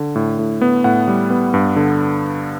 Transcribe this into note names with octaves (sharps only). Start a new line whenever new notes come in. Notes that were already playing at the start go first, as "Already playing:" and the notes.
Already playing: D3
A2
A2
B3
A2 F#5
G3
B3
G2
D3